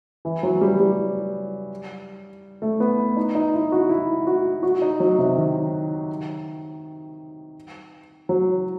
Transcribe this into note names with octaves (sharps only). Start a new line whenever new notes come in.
E3
F#3
G3
G3
A3
B3
D#4
D#4
E4
F#4
E4
F#4
F#4
D#4
F#3
C3
D#3
F#3